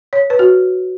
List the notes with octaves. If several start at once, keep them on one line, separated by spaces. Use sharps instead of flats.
C#5
B4
F#4